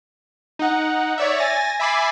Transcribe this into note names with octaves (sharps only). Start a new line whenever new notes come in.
D#4 F#5
C#5 D5 E5
G#5 A6 A#6
E5 G#5 B5 D6 A6 C7